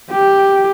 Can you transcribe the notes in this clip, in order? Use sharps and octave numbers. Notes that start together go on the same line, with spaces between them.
G4